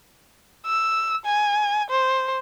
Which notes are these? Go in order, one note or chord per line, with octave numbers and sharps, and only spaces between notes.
E6
G#5
C5